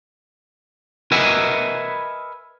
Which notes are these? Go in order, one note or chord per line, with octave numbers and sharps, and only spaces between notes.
A#4 B4 D#5 E5 F#5 G#5